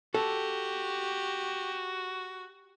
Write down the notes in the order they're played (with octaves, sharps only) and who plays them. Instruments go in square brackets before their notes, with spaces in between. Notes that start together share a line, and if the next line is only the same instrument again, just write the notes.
[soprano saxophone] F#4 [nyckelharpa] G4 [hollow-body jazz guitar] A4